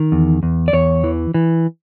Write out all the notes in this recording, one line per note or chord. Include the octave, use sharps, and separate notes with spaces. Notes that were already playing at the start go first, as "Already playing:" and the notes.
Already playing: D#3
E2
E2
D5
E2 C#5
E3
E3